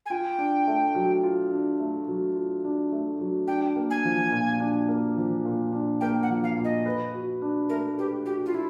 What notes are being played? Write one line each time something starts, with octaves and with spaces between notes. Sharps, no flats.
G#5
F4 G5
D4
A3
F#3
F4
D4
A3
F#3
F4
D4
A3
F#3
D4 G5
A#3
G#5
F3
A#2
D4
A#3
F3
A#2
D4
A#3 G5
F#5
F3
F5
A#2
D#5
B4
F#4
D4
A3 A#4
G4 B4
F#4 G4
F4
E4